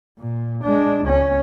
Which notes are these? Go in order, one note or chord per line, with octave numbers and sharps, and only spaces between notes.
A#2
G#3 D4
C#2 C#4